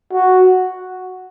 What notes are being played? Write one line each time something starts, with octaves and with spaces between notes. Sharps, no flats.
F#4